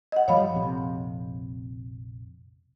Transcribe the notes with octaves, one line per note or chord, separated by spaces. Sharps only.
D#5 F#5
G2 F3 G3 C#5 F5 B5
A#1 F2 C3